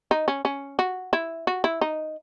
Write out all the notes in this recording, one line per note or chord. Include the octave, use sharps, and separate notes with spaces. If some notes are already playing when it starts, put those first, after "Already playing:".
D#4
C#4
C#4
F#4
E4
F#4
E4
D#4